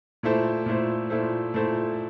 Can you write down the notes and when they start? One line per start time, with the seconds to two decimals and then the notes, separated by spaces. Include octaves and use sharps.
0.23 A#2 A3 E4 A4 C5
0.66 A#2 A3 E4 A4 C5
1.10 A#2 A3 E4 A4 C5
1.54 A#2 A3 E4 A4 C5